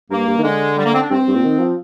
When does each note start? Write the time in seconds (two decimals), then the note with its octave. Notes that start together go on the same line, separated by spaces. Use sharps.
0.10 G2 A#3
0.27 G2
0.38 D#3
0.43 D3 G#3
0.77 G3
0.86 A#3
0.93 C4
1.01 D4
1.10 G2 C4
1.27 G2
1.35 A#2
1.43 D#3
1.59 F3